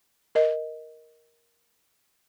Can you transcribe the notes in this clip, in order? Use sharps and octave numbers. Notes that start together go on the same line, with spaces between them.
A#4 D#5